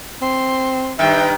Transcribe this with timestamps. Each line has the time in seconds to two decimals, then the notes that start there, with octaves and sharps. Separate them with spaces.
0.22 C4 C6
0.99 G2 D#3 E5 G5